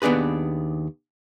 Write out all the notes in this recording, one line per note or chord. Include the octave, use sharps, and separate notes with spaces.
D#2 B3 D4 G#4 B4